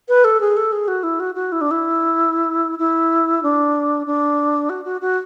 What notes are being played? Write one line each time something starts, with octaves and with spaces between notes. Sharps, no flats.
B4
A4
G#4
A4
G#4
F#4
E4
F#4
F#4
E4
D4
E4
E4
D4
D4
F#4
F#4
F#4